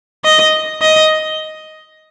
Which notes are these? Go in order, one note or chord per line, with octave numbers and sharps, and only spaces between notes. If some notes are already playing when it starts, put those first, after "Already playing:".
D#5
D#5